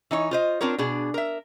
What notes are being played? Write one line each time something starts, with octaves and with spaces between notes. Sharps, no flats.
E3 D#4 C#5
F4 C5 D#5
C4 D4 F4 A#4 C#5
B2 D4 G#4
A#4 E5